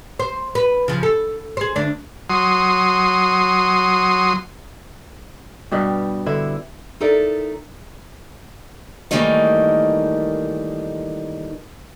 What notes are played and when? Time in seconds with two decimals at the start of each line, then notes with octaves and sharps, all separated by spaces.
0.19 C5
0.55 B4
0.88 C#3 F3
1.03 A4
1.57 G#4 C5
1.76 D2 D4
2.30 F#3 C6 D#6
5.71 G2 B2 G3 G4
6.26 D3 E4
7.00 D#4 E4 A4 A#4 D5 E5
9.11 D#3 E3 G3 A3 A#3 D#4